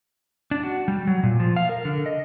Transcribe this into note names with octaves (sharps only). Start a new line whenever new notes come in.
D4
F#4
G3
F#3
A#2
F3
F5
A#4
D3
D#5